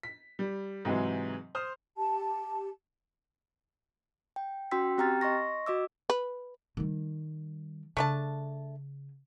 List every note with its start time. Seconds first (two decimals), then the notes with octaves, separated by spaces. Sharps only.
0.03 B6
0.39 G3
0.85 G#2 C3 E3 F#3 G#3
1.55 C5 C6 D#6 F6
1.98 G4 A5
4.36 G5
4.71 C#4 F#4 G5 C6 E6 B6
4.98 C4 G4 G5 A#5 F6 A6
5.21 D#5 C6 C#6 A#6
5.66 F#4 D#5 D6 E6
6.10 B4
6.77 D#3 G3
7.97 C#3 A3 D4 A5